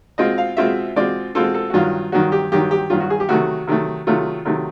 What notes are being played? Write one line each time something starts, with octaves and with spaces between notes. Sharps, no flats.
B2 G#3 C4 F4 D#5
F5
B2 G#3 C4 F4 E5
B2 G#3 C4 F4 D5
B2 G#3 C4 F4 A4
A4
F#4
G2 D#3 F#3 F4
G2 D#3 F#3 F#4
G4
G2 D#3 F#3 G4
G4
G2 D#3 F#3 F4
F#4
G#4
G4
C3 D#3 F#3 A3 F#4
C3 D#3 F#3 A3
C3 D#3 F#3 A3 F4
C3 D#3 F#3 A3